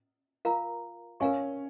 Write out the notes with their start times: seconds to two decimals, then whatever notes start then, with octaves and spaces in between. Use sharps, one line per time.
0.45 F4 A#4 F5 A#5
1.20 C#4 A#4 F5 G#5 C#6